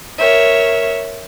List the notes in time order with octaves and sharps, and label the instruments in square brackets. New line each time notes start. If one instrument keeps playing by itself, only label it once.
[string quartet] A#4 C#5 E5